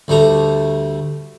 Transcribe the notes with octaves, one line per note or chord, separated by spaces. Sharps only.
D2 G3 A3 A#5